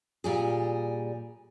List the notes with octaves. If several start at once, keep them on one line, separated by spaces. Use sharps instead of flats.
A#2 G3 G#4